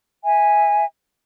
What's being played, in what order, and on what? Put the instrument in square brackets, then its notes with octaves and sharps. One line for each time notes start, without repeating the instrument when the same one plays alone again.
[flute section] E5 G#5